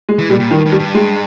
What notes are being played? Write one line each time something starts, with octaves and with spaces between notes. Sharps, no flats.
G#3
E3
A#2 G3
A#2
G2 D#3
G2
G3
G2
G#3